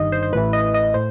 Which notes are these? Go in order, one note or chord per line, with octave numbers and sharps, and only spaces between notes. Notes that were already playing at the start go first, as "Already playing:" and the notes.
Already playing: G1 G2 D#3 D#5
C5
C5
A1 A2 E3 B4
D#5
D#5
A2 C5